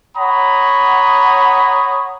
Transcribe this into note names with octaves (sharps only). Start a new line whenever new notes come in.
C#5 F#5 A#5 B5 D#6